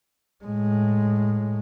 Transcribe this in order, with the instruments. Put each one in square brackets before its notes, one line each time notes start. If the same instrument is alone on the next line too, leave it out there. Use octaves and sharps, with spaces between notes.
[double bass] A2 G#3